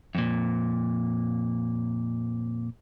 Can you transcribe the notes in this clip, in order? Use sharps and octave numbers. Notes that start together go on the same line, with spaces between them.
F2 A#2